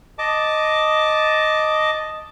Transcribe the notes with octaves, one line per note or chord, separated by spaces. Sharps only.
D#5 A5 D6